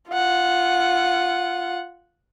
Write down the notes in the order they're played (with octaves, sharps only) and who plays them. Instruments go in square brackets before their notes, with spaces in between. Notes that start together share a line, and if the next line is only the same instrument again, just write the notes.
[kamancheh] F4 F#5